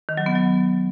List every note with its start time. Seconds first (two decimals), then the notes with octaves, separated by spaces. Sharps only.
0.09 D#3
0.17 F#3
0.26 B3
0.35 F#3